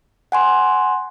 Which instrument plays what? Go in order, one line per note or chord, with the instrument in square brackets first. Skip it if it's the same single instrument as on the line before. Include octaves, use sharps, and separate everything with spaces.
[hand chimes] F#5 G#5 C6